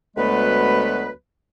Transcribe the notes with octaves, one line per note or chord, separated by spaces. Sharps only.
D2 F#3 G#3 A3 B3 B4